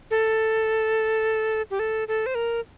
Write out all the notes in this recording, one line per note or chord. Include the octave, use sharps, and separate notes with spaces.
A4
G4
A4
A4
C5
A#4